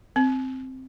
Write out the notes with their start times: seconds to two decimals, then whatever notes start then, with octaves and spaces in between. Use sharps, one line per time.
0.16 C4